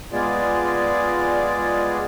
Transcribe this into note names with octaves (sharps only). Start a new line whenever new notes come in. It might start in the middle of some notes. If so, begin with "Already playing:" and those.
G#3 B3 F4 G#4 D5